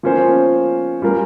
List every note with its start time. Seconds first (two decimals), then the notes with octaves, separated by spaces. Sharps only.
0.03 F3 A#3 C#4 F4 C5
1.02 G3 C#4 F4 A#4